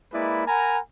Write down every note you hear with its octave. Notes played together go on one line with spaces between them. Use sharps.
G#3 A#3 E4 B4 D5
A#4 F#5 G#5 A#5 B5